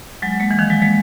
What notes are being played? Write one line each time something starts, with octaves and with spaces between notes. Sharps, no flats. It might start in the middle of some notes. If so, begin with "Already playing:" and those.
F#3 G#3
G#3 A#3
E3
D#3 F3
F#3 G#3
G#3 A#3